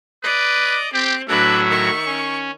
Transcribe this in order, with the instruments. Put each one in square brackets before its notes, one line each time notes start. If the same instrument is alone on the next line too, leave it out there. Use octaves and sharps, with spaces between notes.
[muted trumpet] B4 [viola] D5 [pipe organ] D#5
[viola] C4 [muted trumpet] G4
[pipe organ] A2 F#3 F#4 [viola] D4 B4 [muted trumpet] E5
[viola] D#3 C#6
[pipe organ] C#4